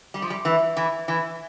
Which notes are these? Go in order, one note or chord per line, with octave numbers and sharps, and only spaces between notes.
G3
F3
G3
E3
E3
E3